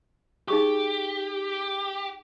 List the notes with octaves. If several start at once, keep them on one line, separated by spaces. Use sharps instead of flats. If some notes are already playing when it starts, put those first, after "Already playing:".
D#4 G4 G#4 C#6